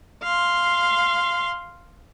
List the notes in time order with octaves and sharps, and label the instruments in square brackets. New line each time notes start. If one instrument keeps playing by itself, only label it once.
[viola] F5 C6